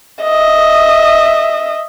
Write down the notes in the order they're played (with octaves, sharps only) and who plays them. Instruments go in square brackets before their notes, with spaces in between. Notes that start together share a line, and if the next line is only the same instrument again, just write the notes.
[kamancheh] D#5 E5